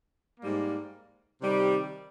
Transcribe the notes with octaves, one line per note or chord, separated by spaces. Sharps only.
G#2 G3 A#3
C3 D#3 G3